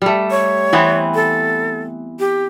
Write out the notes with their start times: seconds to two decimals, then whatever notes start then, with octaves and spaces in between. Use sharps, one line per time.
0.02 G3 A3
0.31 C#5
0.73 E3 B3 C4
1.15 A4
2.20 G4